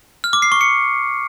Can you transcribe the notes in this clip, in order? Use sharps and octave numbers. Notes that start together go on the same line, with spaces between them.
F6
D6
C7
C#6
C#7